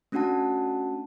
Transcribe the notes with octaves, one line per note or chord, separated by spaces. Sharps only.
A3 C#4 D4 F#4 F#5 A5